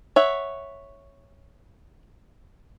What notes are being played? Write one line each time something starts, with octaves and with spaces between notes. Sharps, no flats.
C#5 E5 F#5